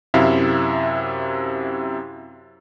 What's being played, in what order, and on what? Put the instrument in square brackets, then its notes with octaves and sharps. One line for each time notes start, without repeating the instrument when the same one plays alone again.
[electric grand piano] F#2 C3 E4 E5 F5